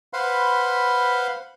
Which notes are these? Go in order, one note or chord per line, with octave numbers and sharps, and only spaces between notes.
B4 C5 F5 F#5 B5 C6